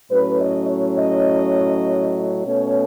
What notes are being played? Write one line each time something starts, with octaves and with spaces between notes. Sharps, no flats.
A2 F#3 C#4 B4
D#5
C#5
D#5
B2 A3 C#4 C#5